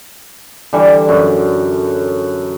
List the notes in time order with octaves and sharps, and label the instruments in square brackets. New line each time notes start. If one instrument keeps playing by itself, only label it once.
[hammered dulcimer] D3 E3 G3
F#2